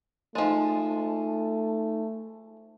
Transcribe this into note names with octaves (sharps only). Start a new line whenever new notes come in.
F3 G#3 A3 D#4 A5